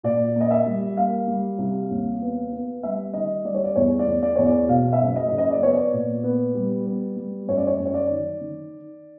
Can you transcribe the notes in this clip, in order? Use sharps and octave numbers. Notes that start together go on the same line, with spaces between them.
A#2 D5
A#3
D#5
E5
G3
A#3 F5
G3
C2
D#2
B3
B3
G3 E5
D#3 D#5
G3 D5
C#5
D5
E2 C#5
D5
E2
D5
E2 C#5
D5
B2 F5
E5
F#1
D#5
F#1
D#5
D5
B3 C#5
D5
A#2
B3
G3
B3
G3
F#2 C#5
D5
C#5
F#2
C#5
D5
D#3
D#3